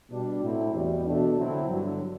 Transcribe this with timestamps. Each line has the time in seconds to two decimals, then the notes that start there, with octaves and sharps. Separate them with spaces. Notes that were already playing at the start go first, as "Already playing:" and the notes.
0.10 B2 G3 D4
0.42 A2 F#3 C4 E4
0.73 E2 B2 G3
1.06 B2 A3 D4
1.37 D3 F#3 C4 E4
1.69 G2 D3 F#3